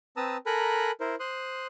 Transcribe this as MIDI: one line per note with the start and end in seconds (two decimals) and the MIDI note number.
0.17 0.37 60
0.17 0.37 71
0.17 0.37 81
0.17 0.37 82
0.17 0.37 87
0.17 0.37 88
0.46 0.91 69
0.46 0.91 70
0.46 0.91 80
0.46 0.91 82
0.46 0.91 83
0.46 0.91 90
1.00 1.15 64
1.00 1.15 70
1.00 1.15 72
1.20 1.67 72
1.20 1.67 84
1.20 1.67 87
1.20 1.67 90